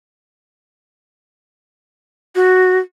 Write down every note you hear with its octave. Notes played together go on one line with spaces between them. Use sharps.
F#4